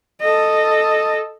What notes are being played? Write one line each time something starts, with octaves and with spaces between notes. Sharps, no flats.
A4 D#5